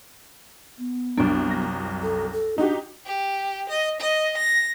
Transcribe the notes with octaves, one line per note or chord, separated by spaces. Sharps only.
B3
C2 F#2 D4
A#6
A4
A4
D4 D#4 F#4 G4
G4
D#5
D#5
A#6